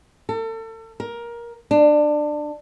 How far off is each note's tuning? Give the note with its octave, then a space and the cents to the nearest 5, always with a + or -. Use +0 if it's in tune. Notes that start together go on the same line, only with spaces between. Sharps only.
A4 +35
A#4 +15
D4 +20